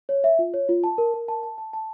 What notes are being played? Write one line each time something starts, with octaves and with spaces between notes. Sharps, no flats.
C#5
E5
F4
C#5
F4
A5
A#4
A#4
A5
A5
A5
A5